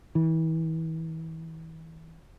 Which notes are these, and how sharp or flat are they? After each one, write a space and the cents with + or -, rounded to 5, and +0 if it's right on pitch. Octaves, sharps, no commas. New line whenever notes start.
E3 -35